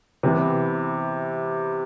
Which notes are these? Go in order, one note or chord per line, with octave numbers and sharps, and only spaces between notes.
C3 E3 B3